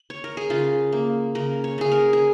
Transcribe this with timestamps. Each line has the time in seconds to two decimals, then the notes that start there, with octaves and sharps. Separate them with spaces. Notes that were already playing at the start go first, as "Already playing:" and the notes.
Already playing: D#5
0.10 C#5
0.24 A#4
0.37 G#4
0.50 C#3 F4
0.92 A#3
1.35 C#3 A#4
1.64 C#5
1.78 C#3 G#4
1.92 A#4
2.13 G#4